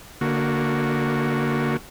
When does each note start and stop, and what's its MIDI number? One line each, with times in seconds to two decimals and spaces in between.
0.21 1.77 50
0.21 1.77 58
0.21 1.77 66